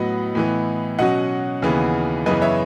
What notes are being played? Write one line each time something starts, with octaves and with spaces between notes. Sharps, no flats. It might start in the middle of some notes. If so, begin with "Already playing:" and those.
Already playing: A2 F#3 B3 D#5 F#5
A2 E3 B3
B2 F#3 C#4 D#5 F#5
D#2 C#3 E3 B3
F#2 C#3 E3 B3 B4 D#5
C#5 E5